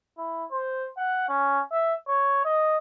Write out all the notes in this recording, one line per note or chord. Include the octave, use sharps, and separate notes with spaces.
E4
C5
F#5
C#4
E5
C#5
D#5